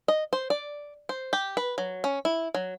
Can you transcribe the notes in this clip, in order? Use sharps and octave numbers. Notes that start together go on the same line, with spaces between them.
D#5
C5
D5
C5
G4
B4
F#3
C#4
E4
F#3